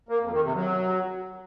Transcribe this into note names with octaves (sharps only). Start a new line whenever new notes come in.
A#3
F2
D#3
C3
F#3